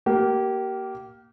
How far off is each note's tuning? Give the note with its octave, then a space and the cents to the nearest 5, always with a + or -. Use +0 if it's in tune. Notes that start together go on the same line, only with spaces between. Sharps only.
A#3 +0 G4 -30